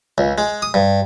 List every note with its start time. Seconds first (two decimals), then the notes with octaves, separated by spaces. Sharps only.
0.18 C#2
0.38 G#3
0.62 D#6
0.74 G2